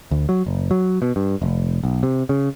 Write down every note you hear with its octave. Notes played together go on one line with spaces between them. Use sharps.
D2
F#3
F#1
F#3
B2
G2
F1
B1
C3
C#3